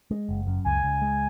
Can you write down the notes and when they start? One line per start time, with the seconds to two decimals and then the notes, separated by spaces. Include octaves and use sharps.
0.11 G#3
0.29 F#1
0.47 F#2
0.65 C#2 G#5
0.84 C#2
1.02 G#3